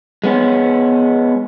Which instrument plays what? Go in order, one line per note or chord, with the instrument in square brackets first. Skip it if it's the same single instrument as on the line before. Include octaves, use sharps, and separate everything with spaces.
[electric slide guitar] G#3 B3 C#4